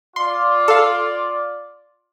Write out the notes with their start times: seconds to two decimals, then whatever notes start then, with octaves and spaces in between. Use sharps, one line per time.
0.16 F4 D5 C6
0.68 A4 F5